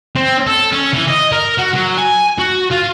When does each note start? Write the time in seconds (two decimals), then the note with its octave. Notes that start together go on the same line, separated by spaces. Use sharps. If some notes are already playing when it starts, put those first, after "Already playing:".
0.16 C4
0.47 A4
0.72 C#4
0.93 E3
1.08 D#5
1.32 A#4
1.59 F#4
1.74 F#3
1.98 G#5
2.38 F#4
2.70 F4